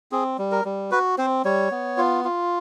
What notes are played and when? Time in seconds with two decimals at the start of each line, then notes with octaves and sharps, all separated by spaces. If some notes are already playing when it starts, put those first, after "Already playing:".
0.12 C4 G#4
0.38 G3
0.51 A#4
0.65 G3
0.91 F#4 B4
1.18 C4 C5
1.45 G3 C#5
1.71 B3
1.98 F4
2.25 F4